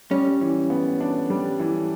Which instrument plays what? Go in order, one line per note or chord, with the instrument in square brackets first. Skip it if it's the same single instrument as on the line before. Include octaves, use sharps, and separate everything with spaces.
[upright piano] G3 [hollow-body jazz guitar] C#4
[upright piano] E3
B3
D4
G3
E3